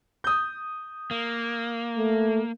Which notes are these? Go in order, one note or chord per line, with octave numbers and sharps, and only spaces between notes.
D#6 G6
A#3
A3